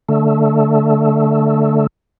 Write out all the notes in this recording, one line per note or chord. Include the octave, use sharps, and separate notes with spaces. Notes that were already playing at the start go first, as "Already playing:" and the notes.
D3 A3